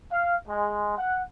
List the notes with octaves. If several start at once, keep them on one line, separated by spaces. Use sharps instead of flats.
F5
G#3
F#5